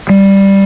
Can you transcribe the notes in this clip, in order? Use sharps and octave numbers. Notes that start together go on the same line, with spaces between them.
G3